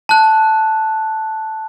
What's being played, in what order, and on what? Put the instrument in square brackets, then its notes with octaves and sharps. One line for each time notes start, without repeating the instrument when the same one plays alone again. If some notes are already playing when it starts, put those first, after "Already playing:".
[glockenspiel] A5 F#6